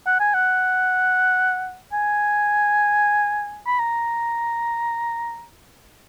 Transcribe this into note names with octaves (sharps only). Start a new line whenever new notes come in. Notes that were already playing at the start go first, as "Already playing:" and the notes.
F#5
G#5
F#5
G#5
B5
A#5